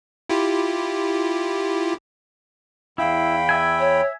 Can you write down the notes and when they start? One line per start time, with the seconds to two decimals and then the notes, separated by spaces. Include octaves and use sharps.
0.29 E4 F4 G4
2.98 E2 E4 F5 G5 B5
3.49 E5 G#5
3.80 C#5